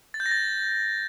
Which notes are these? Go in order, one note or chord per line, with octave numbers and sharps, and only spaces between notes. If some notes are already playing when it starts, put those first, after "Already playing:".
A6
G6
A#6
A6